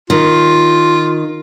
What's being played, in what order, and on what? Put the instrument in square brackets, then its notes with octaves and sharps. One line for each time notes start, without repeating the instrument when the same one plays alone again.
[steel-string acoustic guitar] D#3 [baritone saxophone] F4